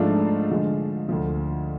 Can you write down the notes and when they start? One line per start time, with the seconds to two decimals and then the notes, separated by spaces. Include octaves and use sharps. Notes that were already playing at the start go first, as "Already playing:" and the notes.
Already playing: G#2 F3 A3 D4 F4
0.50 D3 F3 G#3
1.09 D2 D3 F3